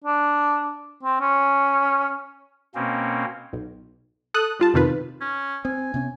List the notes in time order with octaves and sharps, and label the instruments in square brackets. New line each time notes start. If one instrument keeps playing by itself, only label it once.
[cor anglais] D4
C4
C#4
[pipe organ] B2 A#3 C4 C#4
[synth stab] B1
A4 D#6 F#6
G3 F4 A5
B1 F2 C3 D#3 F4 B4
[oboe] C#4
[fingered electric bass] C4 [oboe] G#5
[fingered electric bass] C3 B3 C#4